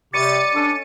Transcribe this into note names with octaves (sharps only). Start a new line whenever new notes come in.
C3 G3 C#5 D#5 D6 A6 C#7 D#7
C#4 D4 A4 C#6